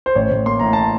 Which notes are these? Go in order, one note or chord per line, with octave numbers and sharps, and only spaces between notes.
C5
A1 C#5
A1
A#3 C6
A2 A#5
A5